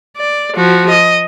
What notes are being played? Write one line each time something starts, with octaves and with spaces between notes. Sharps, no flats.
D5
F3 F#4
D#5